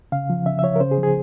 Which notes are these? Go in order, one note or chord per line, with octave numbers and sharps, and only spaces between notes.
C#3 F5
F3
C#3 E5
E5
F3 C#5
A#4
C#3 C5
G#4
F3
G#4